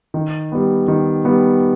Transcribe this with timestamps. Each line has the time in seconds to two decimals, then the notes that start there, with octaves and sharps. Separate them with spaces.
0.14 D#3
0.52 G3 B3
0.88 D#3
1.25 G3 B3